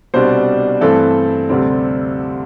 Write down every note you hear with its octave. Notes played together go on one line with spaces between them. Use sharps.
C2 B2 G3 D4 C5
G2 E3 A3 C4 A4
D2 C3 G3 C4